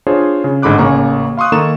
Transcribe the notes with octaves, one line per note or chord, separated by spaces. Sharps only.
D4 F4 G#4 C5 C#5
C#3
A1 G#2 D3 B5 D6 F#6
A1 C#3 A#3 G#5 A#5 C#6
F5 C6 C#6 D#6 F#6
D#3 A#3 A4 A#5 C#6 E7